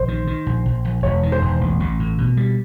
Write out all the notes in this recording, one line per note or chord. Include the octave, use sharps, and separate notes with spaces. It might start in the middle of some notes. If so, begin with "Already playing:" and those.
Already playing: A#1 C5
D#3
D#3
A#1
A#1
A#1
E1 C#5
D#3
C5
E1
A1
A1
A2
B2
G3